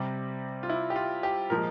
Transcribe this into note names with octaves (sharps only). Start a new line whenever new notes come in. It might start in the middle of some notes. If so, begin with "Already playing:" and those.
Already playing: C3 G3
F4
E4
G4
F4
G4
A#2 F3 G#3 A#4